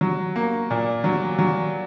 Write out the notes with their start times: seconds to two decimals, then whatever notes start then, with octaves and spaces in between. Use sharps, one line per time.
0.01 F#3
0.36 A#3
0.71 A#2
1.04 F#3
1.39 F#3